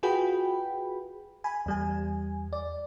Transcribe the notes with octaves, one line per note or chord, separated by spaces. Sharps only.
F4 F#4 G#4 B4 G5 B5
G#5 B5
E2 G3 G#5
D5